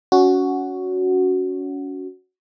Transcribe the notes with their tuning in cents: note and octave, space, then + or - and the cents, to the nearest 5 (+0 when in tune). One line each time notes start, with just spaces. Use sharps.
C#4 +25 F#4 +0